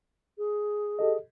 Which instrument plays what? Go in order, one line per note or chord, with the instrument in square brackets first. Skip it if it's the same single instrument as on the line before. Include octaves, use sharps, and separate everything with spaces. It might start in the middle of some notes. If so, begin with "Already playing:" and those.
[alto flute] G#4
[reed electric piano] G4 A4 D#5